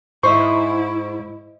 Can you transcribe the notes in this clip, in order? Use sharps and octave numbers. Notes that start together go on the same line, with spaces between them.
G#2 E4 C5 D#5 E5 C#6